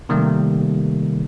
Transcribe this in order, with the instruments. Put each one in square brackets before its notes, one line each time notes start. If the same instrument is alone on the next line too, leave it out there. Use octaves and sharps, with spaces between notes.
[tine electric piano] C3 D#3 G3 A3 A#3